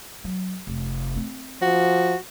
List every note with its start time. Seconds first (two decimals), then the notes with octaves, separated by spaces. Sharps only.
0.24 F#3
0.67 F1
1.15 A3 C4
1.62 F3 F#4